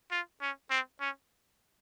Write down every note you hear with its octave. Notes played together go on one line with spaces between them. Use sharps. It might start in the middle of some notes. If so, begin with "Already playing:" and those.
F4
C#4
C4
C#4